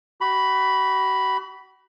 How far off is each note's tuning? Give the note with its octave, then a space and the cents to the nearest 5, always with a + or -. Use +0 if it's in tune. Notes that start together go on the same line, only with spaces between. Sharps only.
F#4 +40 B5 +0